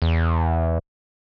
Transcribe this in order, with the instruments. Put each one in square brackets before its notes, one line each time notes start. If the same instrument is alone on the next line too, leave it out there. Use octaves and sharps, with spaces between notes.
[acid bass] E2